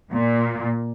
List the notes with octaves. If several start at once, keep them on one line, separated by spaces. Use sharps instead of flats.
A#2